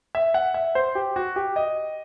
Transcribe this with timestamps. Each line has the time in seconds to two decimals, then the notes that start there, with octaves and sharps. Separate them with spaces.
0.15 E5
0.34 F#5
0.54 E5
0.75 C5
0.95 G4
1.16 F#4
1.36 G4
1.56 D#5